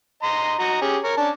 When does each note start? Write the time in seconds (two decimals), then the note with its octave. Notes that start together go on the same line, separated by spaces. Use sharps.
0.23 D#5 A#5 C6
0.59 F#4 D#5 A#5
0.81 C#4 G4 G#4
1.04 A#4 C#5
1.17 C#4 D4 A5